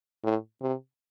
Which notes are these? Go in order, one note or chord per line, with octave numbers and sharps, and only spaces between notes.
A2
C3